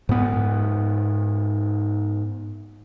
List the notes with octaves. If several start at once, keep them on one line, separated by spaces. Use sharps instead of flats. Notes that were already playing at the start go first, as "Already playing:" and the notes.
G#2 B3